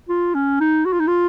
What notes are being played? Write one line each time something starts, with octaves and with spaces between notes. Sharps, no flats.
F4
C#4
D#4
F#4
F4
D#4
F4